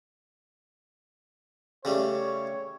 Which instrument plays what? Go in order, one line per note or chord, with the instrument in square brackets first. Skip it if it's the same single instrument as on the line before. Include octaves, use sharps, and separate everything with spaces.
[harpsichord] C#3 G3 A3 [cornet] C#5